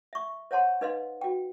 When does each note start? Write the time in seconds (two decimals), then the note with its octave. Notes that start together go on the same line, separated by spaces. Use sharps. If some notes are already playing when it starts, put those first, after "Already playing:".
0.13 E5 C#6
0.51 C5 C#5 F#5 A5 C6
0.81 D#4 B4 D#5 F5 C6
1.21 F#4 G5